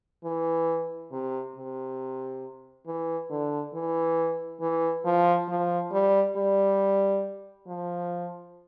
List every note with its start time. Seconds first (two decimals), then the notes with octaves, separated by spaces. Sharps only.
0.24 E3
1.12 C3
1.56 C3
2.87 E3
3.30 D3
3.74 E3
4.61 E3
5.05 F3
5.49 F3
5.92 G3
6.36 G3
7.67 F3